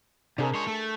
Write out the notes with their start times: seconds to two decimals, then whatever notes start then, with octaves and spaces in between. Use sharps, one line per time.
0.38 C3 D4 G#4 A#4
0.54 G#3 C#5
0.67 A3